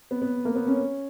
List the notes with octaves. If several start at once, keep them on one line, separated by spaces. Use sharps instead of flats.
B3
B3
A#3
B3
C#4